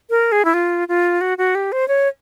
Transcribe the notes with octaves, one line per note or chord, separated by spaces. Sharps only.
A#4
G#4
E4
F4
F4
F#4
F#4
G4
C5
C#5